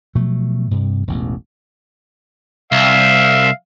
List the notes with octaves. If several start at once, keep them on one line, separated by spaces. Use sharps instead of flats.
B2 F3 F#3 A3
G2 C3
E1 A1
C2 E5 F5